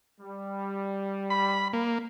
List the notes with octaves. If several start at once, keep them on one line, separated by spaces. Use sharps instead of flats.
G3
B5
A#3